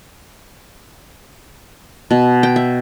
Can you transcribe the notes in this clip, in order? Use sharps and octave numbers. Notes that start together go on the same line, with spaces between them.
B2
G5
E5